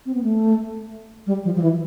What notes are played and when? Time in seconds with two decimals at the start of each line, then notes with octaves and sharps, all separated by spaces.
0.06 C4
0.14 B3
0.23 A3
1.27 G3
1.44 F3
1.56 F3
1.62 E3